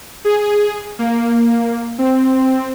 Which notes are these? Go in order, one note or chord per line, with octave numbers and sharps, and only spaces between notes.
G#4
A#3
C4